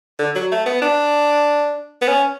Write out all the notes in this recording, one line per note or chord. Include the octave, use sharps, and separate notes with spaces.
D3
F#3
A3
B3
D4
B3
C#4